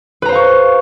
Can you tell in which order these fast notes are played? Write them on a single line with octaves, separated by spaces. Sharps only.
B4 A#5 C5 F5 C#6